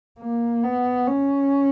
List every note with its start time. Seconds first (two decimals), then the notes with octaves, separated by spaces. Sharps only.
0.19 A#3
0.64 B3
1.08 C#4